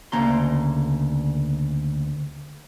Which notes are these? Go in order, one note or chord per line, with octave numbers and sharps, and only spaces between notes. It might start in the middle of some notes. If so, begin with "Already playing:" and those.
D2 C#3 A#3 A#5 C6